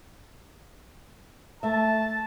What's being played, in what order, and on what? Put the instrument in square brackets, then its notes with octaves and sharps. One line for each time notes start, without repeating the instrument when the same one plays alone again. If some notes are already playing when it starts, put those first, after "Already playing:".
[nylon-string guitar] A3 E5 [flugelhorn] A5